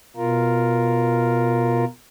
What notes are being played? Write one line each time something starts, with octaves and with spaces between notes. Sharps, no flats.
B2 F4 A#4